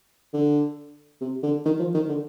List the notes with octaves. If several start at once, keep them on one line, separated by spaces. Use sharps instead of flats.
D3
C3
D3
D#3
F3
D#3
D3